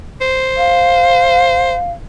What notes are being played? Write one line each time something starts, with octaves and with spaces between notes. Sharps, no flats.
C5
F5